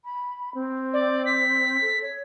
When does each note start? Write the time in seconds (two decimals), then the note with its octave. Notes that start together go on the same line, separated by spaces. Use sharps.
0.05 B5
0.54 C4
0.94 D5
1.26 B6
1.81 A4
2.02 C#5